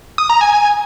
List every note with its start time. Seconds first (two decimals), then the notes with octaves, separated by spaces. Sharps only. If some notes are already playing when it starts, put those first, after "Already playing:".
0.18 D#6
0.30 A#5
0.41 G#5